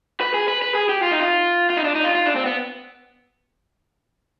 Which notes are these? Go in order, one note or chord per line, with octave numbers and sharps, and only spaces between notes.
B4
G#4
B4
B4
G#4
G4
F4
D#4
F4
F4
D#4
D4
D#4
F4
F4
D4
C4
B3